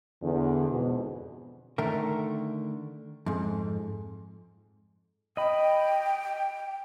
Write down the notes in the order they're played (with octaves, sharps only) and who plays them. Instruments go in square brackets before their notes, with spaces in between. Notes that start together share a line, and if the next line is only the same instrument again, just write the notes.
[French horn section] E2 D3
F2 G#2 B2
[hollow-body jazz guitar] D3 D#3 A3 A#4
F2 G#2
[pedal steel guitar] D#5 B5 [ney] G5